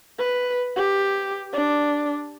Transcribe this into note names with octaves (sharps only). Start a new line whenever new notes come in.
B4
G4
D4